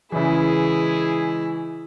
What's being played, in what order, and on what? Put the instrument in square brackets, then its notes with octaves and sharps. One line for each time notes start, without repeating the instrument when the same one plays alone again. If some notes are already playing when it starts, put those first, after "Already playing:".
[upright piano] C#3 E3 [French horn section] G#3 G#4 [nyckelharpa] E4